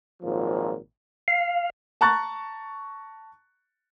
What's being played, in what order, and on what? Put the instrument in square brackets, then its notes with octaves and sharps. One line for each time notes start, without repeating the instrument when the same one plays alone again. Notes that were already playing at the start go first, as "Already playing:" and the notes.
[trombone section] G#1 A#2 F3 F#3
[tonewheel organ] F5
[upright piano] A5 A#5 C#6 F#6 A6